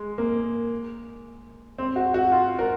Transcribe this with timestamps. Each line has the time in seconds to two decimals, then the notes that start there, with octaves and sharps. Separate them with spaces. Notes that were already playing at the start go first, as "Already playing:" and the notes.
Already playing: G#3
0.18 A#3
1.78 C4
1.96 F#4
2.14 F#4
2.32 F4
2.59 A#4